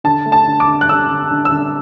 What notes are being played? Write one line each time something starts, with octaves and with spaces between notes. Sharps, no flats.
D3 A5
A3
A5
D3
D6
D3
F#6
D3 E6
D3
D3
E6
D3